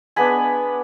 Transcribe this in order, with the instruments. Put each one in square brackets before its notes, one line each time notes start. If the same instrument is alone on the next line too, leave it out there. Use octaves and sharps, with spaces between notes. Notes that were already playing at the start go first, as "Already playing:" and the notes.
[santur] G#3 B3 D4 G#5 B5